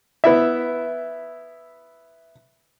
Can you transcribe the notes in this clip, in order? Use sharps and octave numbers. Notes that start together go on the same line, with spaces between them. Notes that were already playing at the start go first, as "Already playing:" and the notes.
B3 E4 E5